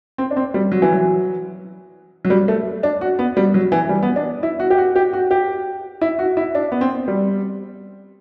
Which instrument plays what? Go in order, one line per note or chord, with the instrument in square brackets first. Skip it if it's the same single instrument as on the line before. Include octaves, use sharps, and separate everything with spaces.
[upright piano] C4
D4
C4
G3
F#3
E3
F#3
F#3
G3
A3
D4
F#4
B3
G3
F#3
E3
G3
B3
D4
E4
F#4
G4
F#4
G4
F#4
G4
E4
F#4
E4
D4
B3
C4
G3